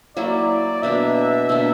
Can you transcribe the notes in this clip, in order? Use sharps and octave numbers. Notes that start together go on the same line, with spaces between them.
F#3 A#3 E4 D5
B2 A#3 D4 E5
B2 A#3 D4